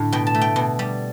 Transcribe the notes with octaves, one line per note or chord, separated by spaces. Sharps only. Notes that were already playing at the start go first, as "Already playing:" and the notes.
Already playing: A2 D3
B2 G5
A5
A3
G5
B2
G3